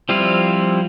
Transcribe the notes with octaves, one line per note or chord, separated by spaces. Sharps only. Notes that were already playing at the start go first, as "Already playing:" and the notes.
F3 G3 C4 E4 F4